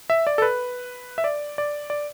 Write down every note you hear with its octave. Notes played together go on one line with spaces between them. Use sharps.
E5
D5
A4
B4
E5
D5
D5
D5